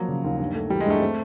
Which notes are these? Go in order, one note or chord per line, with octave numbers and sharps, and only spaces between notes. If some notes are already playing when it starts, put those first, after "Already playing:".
Already playing: F3 F#3 A#3
C#3
D#2
G2
A3
E3 G3
G#3
G2 A3
C4